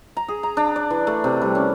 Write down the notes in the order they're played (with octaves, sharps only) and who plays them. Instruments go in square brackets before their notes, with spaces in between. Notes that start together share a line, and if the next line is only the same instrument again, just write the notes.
[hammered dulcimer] A#5
G#4
A#5
D4
D5
E3
A3
C3
G3
C#4